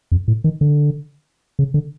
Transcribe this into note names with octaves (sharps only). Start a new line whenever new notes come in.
F2
A2
D#3
D3
C#3
D3